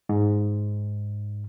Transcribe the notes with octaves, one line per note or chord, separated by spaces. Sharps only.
G#2